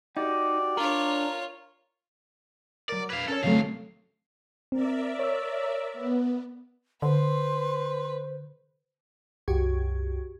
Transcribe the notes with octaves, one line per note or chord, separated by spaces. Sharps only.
D#4 F#4 G4 D5
D4 F4 A#4 C#5
F#3 A#4 D5
B4 F5 G#6
C#4 A4 A#4 C#5
D2 C3 F#3 A3 F5
C4 A#4 D5 E5
C#5 E6
B3
D3 B4 C5 C6
C2 F#2 F#4 G4 C#6 G#6